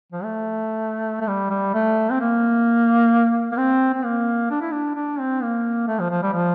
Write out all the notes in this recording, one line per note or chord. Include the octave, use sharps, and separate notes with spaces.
F3
A3
A3
G3
G3
A3
C4
A#3
A#3
C4
C4
A#3
D4
E4
D4
D4
C4
A#3
A3
F3
F3
G3
F3